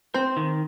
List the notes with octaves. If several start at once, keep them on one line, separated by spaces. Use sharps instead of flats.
C4 C5
D#3